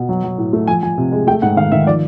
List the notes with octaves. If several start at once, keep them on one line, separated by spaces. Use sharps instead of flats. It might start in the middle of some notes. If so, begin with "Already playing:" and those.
Already playing: B2
F#3
F#3
A2
A3
F3 G#5
F3 G#5
C3
G#3
A3 G5
G#2 F#5
D#3 F5
D#3 E5
F3 D5